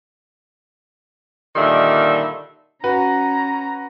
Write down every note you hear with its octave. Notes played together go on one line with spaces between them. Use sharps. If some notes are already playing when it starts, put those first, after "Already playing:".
A#2 D3 D#3 G3 E5
C#4 F#4 B4 A#5